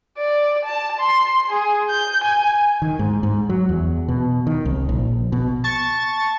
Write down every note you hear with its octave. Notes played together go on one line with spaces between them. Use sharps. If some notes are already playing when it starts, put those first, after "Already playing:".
D5
A5
C6
G#4
G6
G#5
D#3
G#2
G#2
F#3
E2
B2
D#3
C2
A#1
B2
A5 C#6 A6